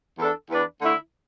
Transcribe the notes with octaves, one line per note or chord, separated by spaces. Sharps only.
E2 E3 D4 A4
E2 E3 D4 B4 D5
D3 A3 E4